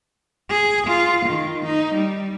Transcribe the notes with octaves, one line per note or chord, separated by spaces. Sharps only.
G#4
F4
D#3
D#4
G3